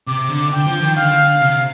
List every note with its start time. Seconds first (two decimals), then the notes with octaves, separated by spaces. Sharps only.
0.07 C3 D6
0.29 D3
0.51 D3 G5
0.66 F3
0.81 D#3
0.89 G5
0.96 D3 F5
1.19 D3
1.41 C3